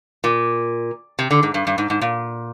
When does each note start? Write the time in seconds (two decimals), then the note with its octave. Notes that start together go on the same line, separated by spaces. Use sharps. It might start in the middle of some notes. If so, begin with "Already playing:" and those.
0.24 A#2
1.19 C3
1.31 D3
1.43 G#2
1.54 G2
1.67 G2
1.78 G#2
1.90 G#2
2.01 A#2